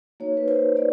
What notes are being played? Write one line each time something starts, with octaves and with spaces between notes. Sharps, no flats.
A#3 D#4 F#4 C#5
B4
C5
D5